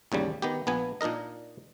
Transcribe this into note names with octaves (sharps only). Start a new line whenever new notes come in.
A1 D#2 C#3 G3
D#3 B3 G4
A#1 B3 G#5
A#2 D4 D#4 A#4 D#5